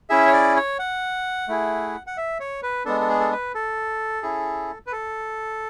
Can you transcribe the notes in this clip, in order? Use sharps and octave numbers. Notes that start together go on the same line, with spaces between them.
C#4 E4 G#4 E5
C#5
D5
C#5
F#5
A3 E4 G#4
F#5
E5
C#5
B4
G#3 B3 D4 A4
A4
G#4
A4
B4
A4
C#4 E4 G#4
B4
A4